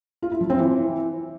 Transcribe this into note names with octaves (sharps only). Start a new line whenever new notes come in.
F4
E4
F3
C4
E3